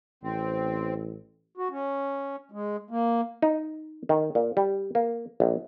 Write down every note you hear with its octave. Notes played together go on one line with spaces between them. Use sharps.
A1 C4
F#4
C#4
G#3
A#3
D#4
D#3
A#2
G3
A#3
A#1